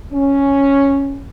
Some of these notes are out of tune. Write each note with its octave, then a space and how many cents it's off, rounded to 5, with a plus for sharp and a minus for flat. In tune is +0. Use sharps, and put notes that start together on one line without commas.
C#4 +0